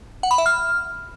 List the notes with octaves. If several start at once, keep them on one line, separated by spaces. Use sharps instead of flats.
F#5
B5
E5
F6